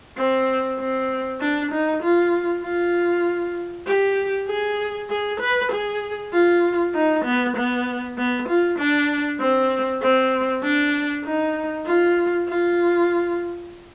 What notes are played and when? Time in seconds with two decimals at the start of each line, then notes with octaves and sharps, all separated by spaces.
0.17 C4
0.79 C4
1.40 D4
1.72 D#4
2.03 F4
2.64 F4
3.87 G4
4.48 G#4
5.10 G#4
5.40 B4
5.72 G#4
6.33 F4
6.95 D#4
7.25 B3
7.56 B3
8.18 B3
8.48 F4
8.79 D4
9.40 C4
10.02 C4
10.63 D4
11.25 D#4
11.86 F4
12.48 F4